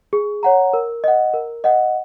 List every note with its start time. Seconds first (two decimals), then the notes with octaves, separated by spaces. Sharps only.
0.13 G#4
0.43 C#5 F#5 A#5
0.73 A#4
1.04 D#5 F#5
1.34 A#4
1.64 D#5 F#5